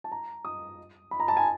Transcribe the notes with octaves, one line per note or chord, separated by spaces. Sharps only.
A5
A#5
D#6
B5
A#5
A5
G#5